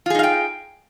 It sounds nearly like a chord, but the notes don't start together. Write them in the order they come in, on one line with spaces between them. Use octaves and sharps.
F4 G#4 D#4 F5 G5